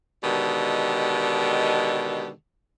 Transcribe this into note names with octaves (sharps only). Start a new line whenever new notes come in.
B2 D3 D#3 G#3 G4